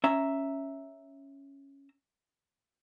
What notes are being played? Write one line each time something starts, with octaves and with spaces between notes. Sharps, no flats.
C#4 E5 A#5